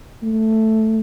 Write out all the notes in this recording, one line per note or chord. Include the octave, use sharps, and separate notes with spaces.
A3